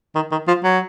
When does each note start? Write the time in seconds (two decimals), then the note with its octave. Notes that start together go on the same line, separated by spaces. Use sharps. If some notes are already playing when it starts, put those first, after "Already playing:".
0.15 D#3
0.32 D#3
0.48 F3
0.64 F#3